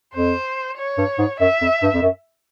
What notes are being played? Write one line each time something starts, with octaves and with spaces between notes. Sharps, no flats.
F2 C5
C#5
G2
G#2
F#2 E5
F2
G2
F2
F#2